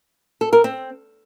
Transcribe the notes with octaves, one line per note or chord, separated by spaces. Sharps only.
A4
A#4
C4